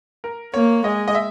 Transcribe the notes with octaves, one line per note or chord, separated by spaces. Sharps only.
A#4
A#3 C#5
G#3 D#5
D#5
E5